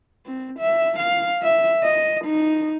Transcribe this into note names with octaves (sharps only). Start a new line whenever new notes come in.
C4
E5
F5
E5
D#5
D#4